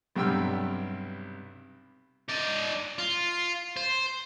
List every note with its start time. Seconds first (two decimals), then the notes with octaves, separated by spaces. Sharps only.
0.16 B1 G2 C3 G5 E6 F6
2.29 D#4 D5
2.98 F4
3.76 C5